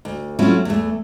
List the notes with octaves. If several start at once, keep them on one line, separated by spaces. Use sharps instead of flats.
D2
F#3 A3 C4 C#4 E4 F4
E2 A3